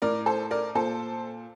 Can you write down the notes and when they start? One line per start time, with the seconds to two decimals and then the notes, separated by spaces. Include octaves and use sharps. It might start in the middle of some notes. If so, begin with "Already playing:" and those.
0.02 A2 A#4 D5
0.26 A4 C5
0.51 A#4 D5
0.75 A#2 A4 C5